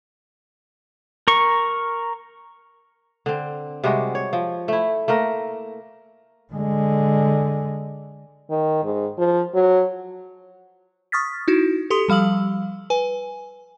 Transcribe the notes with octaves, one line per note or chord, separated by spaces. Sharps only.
A#4 C#6
D3 C4
C3 G3 G#3 F#4
C#5
F3
A3 E4
A3 A#3 A#4
D3 G#3
D#3
G#2
F3
F#3
C#6 D#6 F6 A6 B6
D#4 E4 F#4
G4 A4 C6 D#6
F3 G3 F5 E6 F#7
B4 G#5